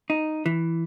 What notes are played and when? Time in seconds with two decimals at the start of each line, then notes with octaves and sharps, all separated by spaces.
0.10 D#4
0.46 E3